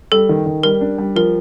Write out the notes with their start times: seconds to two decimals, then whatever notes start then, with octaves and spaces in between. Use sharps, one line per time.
0.12 G3 A4
0.29 D#3
0.46 D#3
0.63 G3 A#4
0.81 D4
0.98 G3
1.16 F3 A#4